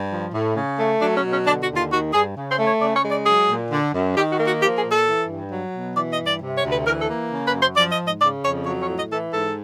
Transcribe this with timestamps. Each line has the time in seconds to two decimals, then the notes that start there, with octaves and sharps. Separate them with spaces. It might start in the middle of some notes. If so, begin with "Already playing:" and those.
Already playing: G2
0.11 F3
0.34 A2
0.56 C#3
0.79 A3
1.01 F#3 D4
1.16 C#4
1.23 B2
1.31 C#4
1.46 D3 D4
1.62 F#4
1.69 D#2
1.76 F4
1.91 D#3 F#4
2.13 G2 G#4
2.36 C#3
2.51 C5
2.59 A3
2.66 C#5
2.81 C#3 D5
2.96 C#5
3.04 G#3
3.11 D5
3.26 F#3 G#4
3.49 A#2
3.71 D3
3.94 F#2
4.16 D#3 G4
4.31 F#4
4.39 A#3
4.46 F#4
4.61 F3 G4
4.76 G#4
4.83 A#2
4.91 A4
5.06 E3
5.28 G2
5.51 F#3
5.74 B2
5.96 E3 D5
6.11 D#5
6.19 G2
6.26 D5
6.41 C3
6.56 C#5
6.64 D2
6.71 B4
6.86 E3 A#4
7.01 A4
7.09 A#3
7.31 C#3
7.46 B4
7.54 F#2
7.61 C5
7.76 F3 D5
7.91 D#5
7.99 G#2
8.06 D#5
8.21 C#3 D5
8.43 F2 C#5
8.66 F#3 C#5
8.81 C#5
8.88 A2
8.97 D#5
9.11 E3 A4
9.33 G#2 A4